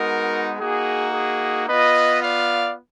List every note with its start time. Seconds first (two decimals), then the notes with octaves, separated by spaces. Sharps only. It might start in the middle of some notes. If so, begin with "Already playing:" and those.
Already playing: G#3 B3 D#4 F#4 A#4
0.59 A#3 D#4 F#4 G#4
1.13 G#4
1.68 B3 F4 B4 D#5
2.23 D5 F5